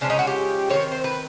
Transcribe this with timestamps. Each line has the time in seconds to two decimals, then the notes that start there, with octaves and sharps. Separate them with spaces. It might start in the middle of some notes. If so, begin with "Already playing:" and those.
0.01 C#3 F3 G#3 C#4 D4
0.10 D#4
0.19 F#4
0.27 G4
0.69 G3 C4 C#5
0.74 D#3
0.92 C5
1.04 B4